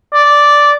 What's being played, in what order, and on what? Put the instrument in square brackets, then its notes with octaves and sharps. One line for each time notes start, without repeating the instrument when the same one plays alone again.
[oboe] D5